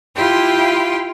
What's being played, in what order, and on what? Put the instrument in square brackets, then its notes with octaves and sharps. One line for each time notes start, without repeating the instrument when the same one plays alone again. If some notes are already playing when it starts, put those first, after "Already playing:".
[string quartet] E4 F4 G4 G5 C6